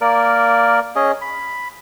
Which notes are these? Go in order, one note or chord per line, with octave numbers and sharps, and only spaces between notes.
A#3 A#4 D5
C#4 G#4 D#5
B5